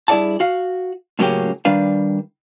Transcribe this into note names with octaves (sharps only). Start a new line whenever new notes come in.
G2 E4 G#4 D5 F#5 A5
F#4 F5
A2 C#3 F#3 A#3 C#4 G4
D#3 G3 D4 B4 F5